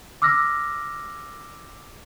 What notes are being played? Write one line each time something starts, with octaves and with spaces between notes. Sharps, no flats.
D6 E6 F6 A#6